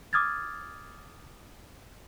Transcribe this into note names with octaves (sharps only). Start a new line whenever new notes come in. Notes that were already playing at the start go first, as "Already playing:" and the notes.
D6 D#6 F6 G#6 A6